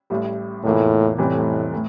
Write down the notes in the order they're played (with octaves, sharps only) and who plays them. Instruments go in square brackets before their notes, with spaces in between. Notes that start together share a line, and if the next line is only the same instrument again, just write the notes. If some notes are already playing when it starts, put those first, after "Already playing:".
[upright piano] A1 A2 G3
[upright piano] F1 E2 E3 A#3 F4 [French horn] A2
[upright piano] F1 F2 E3 G3 C4 [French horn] A2
[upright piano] A2